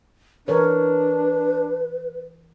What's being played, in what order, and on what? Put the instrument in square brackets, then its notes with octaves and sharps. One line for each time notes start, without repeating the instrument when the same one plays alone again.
[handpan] E3 A#4 C#5 [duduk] D4 [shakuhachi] B4